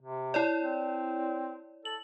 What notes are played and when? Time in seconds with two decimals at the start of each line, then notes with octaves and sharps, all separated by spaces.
0.02 C3
0.34 E4 C#5 D5
0.60 C4
1.85 A4 F#7